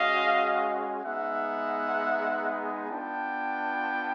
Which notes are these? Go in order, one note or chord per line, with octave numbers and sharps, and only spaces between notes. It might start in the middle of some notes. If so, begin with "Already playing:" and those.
Already playing: G#3 C#4 F#4 D#5 F5
G#3 B3 D#4 E5 F#5
B3 D4 F4 G5 A5